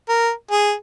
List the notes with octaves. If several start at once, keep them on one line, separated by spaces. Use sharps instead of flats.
A#4
G#4